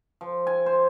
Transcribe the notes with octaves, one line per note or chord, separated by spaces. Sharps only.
F3
G#5
C5